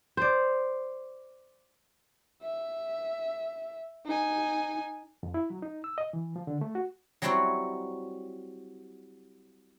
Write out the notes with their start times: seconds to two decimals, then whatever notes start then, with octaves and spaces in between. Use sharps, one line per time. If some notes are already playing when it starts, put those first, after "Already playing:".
0.17 C5 D5
2.42 E5
4.06 D#4 G#5
5.23 F2
5.34 E4
5.50 F#3
5.62 D#4
5.84 E6
5.98 D#5
6.13 E3
6.36 F3
6.47 D3
6.61 A3
6.75 F#4
7.22 F#3 G3 C4 E4 F#4 C#5